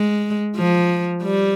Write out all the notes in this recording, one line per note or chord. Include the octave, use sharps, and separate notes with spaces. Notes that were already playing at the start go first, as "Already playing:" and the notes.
Already playing: G#3
F3
G3